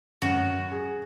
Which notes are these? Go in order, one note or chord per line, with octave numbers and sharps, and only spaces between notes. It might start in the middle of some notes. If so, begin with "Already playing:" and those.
F#2 F#4
G#4